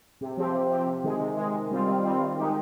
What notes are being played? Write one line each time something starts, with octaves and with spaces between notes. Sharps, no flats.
C3
F3 C4 G4
C3
F3 C4 G4
C3
D#3 G#3
C3
D#3 G#3
D#3
G3 C4 F4
D#3
G3 C4 F4
D#3
G#3 D#4 G4